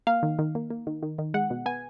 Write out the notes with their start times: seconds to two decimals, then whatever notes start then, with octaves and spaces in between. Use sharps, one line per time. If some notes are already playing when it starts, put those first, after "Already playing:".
0.07 A#3 F5
0.23 D#3
0.39 D#3
0.55 A#3
0.71 A#3
0.87 D#3
1.03 D#3
1.18 D#3
1.34 G#3 F#5
1.50 B2
1.66 B3 G#5